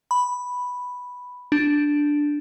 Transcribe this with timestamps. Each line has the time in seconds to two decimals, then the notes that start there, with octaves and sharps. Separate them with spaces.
0.11 B5
1.52 D4